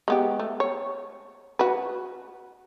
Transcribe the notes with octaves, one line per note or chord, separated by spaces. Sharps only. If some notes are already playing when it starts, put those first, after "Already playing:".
G#3 B3 G4
A3
C#5
F#4 B4